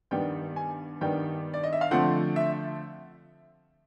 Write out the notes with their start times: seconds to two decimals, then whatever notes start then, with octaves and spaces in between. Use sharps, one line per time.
0.11 G2 D#3 G3 B3 G5
0.56 G#5
1.01 G2 D#3 G3 B3 G5
1.54 D5
1.63 D#5
1.73 E5
1.81 F5
1.91 D3 F3 A3 C4 F#5
2.36 E5